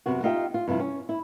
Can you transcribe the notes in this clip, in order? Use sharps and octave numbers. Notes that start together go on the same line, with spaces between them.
F#2 C3 B3 F#4
D#4 F4 G4 D#5 E5 G5
F4
G2 C3 F3 E4
C#4
E4